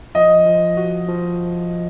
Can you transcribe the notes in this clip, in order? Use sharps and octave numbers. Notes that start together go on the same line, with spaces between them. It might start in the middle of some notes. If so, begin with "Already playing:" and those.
F3 D#5
F3
F#4
F3